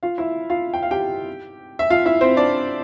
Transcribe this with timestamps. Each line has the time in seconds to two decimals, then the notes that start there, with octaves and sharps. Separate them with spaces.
0.03 F4 F5
0.18 E4 E5
0.50 F4 F5
0.74 G5
0.83 F5
0.91 G4 G5
1.79 E5
1.90 F4 F5
2.06 E4 E5
2.21 C4 C5
2.36 D4 D5